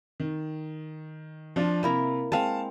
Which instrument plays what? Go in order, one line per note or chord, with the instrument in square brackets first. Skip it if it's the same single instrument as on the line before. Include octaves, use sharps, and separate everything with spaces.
[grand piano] D#3
F3 D4 F4
[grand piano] C3 [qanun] A#3 E4 A#4
[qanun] G#3 C4 [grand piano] F5 A5